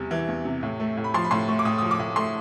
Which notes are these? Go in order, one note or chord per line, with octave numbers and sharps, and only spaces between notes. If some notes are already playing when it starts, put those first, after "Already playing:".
Already playing: E2 C3 G3
E3
E2
C3
A2
A3
A2
B5
F3 C6
B5
A2 C6
A3 C#6
D6
A2 D#6
D#6
F3
D6
A2
A3 C6